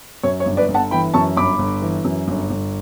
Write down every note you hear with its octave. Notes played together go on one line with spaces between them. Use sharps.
F#2 C#5
C#5
G1
B4 D5
G1
F#5 A5
E3 G5 B5
F#2 A5 C#6
G1 B5 D6
G1
E3
F#2
G1
G1